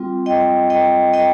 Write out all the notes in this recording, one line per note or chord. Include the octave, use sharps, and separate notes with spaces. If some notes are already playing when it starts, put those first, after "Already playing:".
Already playing: G3 C4 F4
D#5 G5
D#5 G5
D#5 G5